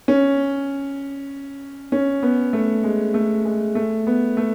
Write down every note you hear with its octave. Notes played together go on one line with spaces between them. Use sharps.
C#4
C#4
B3
A3
G#3
A3
G#3
A3
B3
A3